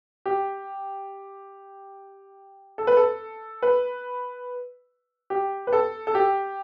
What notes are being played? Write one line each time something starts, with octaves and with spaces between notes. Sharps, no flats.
G4
A4
B4
A4
B4
G4
B4
A4
A4
G4